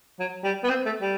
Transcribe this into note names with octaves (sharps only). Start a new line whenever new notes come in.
F#3
G3
B3
C4
A3
G3